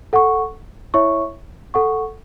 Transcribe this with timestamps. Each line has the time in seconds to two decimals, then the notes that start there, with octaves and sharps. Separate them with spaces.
0.13 A4 F#5 C#6
0.94 E4 C#5 E5 C#6
1.74 A4 F#5 C#6